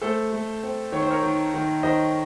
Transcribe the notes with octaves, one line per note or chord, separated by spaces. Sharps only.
A3 A4 C5
A3
C4
D#3 C#5
C5
A#4 C#5
D#3
D#3
D#3 C5 D#5